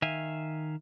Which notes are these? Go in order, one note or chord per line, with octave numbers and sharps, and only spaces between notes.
D#3 E5 F5 G#5